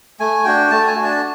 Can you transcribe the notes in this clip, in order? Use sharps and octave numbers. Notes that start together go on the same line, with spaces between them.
A3 G#5
D4 F#4 G5
A3 A5
G#5
D4 F#4
A5